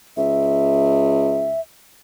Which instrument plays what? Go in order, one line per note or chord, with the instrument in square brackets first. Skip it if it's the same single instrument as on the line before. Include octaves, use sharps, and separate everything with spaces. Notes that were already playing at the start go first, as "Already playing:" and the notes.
[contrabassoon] C#2 [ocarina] E5